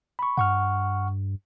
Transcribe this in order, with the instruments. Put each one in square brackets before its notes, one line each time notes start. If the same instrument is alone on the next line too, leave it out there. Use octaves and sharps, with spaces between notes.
[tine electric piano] B5 C#6
[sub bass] G2 [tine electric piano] F#5 C#6 F6